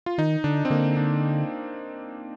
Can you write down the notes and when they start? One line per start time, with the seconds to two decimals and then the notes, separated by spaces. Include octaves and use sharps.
0.06 F4
0.18 D#3 D#4
0.44 D3 D4
0.65 C4
0.70 D3 A#3
0.97 D4